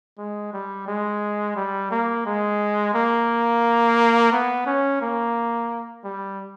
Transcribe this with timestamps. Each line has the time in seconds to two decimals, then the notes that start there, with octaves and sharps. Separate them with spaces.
0.18 G#3
0.53 G3
0.87 G#3
1.56 G3
1.91 A#3
2.26 G#3
2.94 A#3
4.32 B3
4.66 C#4
5.01 A#3
6.04 G3